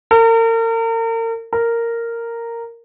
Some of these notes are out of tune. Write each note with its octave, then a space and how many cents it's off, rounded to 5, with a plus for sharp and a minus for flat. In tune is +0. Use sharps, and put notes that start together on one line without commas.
A#4 -40
A#4 -10